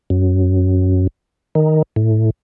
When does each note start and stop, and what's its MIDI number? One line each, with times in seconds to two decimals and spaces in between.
0.10 1.07 42
1.55 1.82 51
1.96 2.30 45